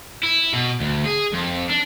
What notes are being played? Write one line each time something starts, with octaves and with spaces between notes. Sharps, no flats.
E4
B2
D2
G#4
F2
D4